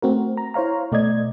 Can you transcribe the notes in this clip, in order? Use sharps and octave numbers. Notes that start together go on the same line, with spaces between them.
A3 C4 F#4 A#4
A#5
E4 C5 C#5 F5 A#5
B2 A3 D5 D#5 G#6